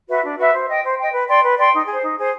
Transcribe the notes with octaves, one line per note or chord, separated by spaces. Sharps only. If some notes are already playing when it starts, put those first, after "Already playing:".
F#4 B4 E5
D4
F#4 B4 E5
C5
D#5 G5
C5
D#5 G5
B4
D5 G5 C6
B4
D5 G5 C6
D#4
G#4 C5
D#4
G#4 C5